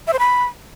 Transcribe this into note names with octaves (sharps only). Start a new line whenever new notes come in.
E5
C5
B5